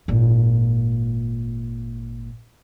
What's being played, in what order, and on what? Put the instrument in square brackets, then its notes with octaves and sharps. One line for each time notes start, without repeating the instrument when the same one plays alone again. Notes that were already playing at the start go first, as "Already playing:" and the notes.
[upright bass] G#1 A#2